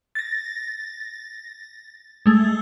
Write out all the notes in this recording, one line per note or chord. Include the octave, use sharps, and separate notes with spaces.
A6 A#6
G#3 A3